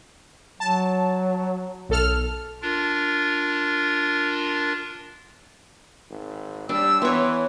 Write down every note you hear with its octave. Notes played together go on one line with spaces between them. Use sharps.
F#3 A5
B1 A4 F6
D4 F4 A#4
G#1
G3 D4 E6
E3 B3 C#5 C6